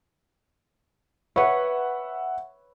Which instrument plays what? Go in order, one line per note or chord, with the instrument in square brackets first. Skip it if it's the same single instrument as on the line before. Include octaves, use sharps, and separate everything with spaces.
[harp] B4 C#5 [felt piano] E5 F#5